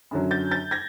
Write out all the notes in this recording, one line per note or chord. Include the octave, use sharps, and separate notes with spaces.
F#2 D3 F#3
G6 A6
G6 A6
G#6 A#6